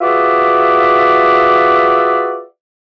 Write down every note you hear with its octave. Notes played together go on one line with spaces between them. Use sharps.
F4 F#4 G#4 B4 D5 E5